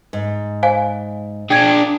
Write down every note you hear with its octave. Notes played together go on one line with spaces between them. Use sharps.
G#2
C5 F5 G#5
D4 G#4 G5 G#6